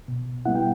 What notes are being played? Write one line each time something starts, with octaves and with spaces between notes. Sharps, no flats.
B2
G3 B3 E4 F#5
G5